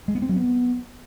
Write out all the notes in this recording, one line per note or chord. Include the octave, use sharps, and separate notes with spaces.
G#3
B3
C4
F#3
B3